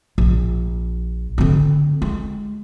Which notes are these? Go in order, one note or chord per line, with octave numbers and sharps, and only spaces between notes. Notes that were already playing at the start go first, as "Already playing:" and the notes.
A#1
D3 C4
G#3